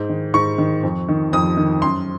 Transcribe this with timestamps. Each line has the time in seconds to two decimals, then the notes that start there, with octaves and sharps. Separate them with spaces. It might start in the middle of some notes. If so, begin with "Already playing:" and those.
Already playing: G#2
0.09 D#3
0.34 G#2 C#6
0.58 D#3
0.83 F2
1.09 D#3
1.33 F2 D#6
1.57 D#3
1.82 F#2 C6